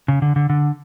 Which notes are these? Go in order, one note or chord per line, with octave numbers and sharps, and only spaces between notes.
C#3
D3
D3
D3